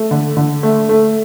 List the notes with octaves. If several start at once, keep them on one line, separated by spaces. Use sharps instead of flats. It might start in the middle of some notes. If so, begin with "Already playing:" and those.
Already playing: A3
D3
D3
A3
A3